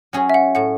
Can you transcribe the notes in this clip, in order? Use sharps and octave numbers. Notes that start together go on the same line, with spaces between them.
F#3 C#4 G#4 C#5
E5
F#5
A2 F#5